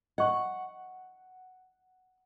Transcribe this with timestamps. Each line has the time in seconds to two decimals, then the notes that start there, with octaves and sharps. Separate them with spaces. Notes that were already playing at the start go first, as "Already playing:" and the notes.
0.18 D#5 F#5 C#6